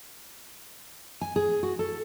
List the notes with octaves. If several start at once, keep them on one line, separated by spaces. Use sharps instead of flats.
G#5
G#4
F#4
A4